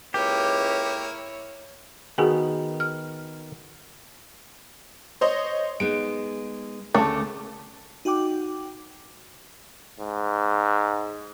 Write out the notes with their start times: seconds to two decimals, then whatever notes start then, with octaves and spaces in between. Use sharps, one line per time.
0.14 C#2 A#3 E4 G4 C#5
2.18 D#3 B3 F#4 G#4 G#5
2.80 F6
5.21 C5 C#5 D#5
5.80 G#3 B3 D#4 D7
6.95 D2 C#3 A3 A5 D6
8.05 D#4 F#4 F#5 G5 D6
10.00 G#2